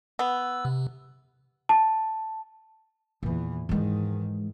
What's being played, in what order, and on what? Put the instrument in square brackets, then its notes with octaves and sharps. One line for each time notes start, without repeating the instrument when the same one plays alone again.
[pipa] B3 [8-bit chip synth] E6
[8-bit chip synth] C3
[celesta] A5
[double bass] E2 E3 [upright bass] A#2 D#3
[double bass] G#2 D#3 [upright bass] E3 G#3